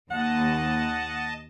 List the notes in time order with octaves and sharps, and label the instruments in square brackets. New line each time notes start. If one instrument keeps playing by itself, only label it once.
[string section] D#2 [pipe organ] D#5 A5 [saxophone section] F#5